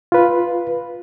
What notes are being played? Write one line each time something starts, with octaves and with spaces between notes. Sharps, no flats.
F4 B4